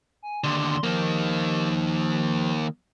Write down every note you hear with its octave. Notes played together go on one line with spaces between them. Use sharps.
G#5
D#2 D3 C6
D#3 F3 A#3